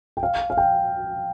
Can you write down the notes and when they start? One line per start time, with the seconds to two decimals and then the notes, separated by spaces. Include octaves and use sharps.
0.17 G5
0.23 F5
0.50 F5
0.57 G5